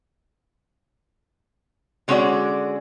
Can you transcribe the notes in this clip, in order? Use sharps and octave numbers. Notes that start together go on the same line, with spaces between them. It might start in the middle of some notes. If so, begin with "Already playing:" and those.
D3 G#3 C#4 D4 F#4 D5